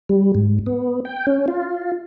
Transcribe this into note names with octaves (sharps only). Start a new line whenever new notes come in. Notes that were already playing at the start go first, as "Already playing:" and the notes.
G3
G#2
B3
G5
C#4
F4